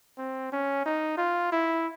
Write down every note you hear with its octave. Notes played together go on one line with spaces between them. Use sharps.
C4
C#4
D#4
F4
E4